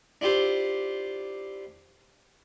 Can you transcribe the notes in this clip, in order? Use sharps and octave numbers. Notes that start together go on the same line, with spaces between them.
D4 E4 F4 G4 C5